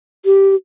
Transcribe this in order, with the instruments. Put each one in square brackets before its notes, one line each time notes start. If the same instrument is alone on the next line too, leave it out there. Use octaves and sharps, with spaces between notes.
[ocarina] G4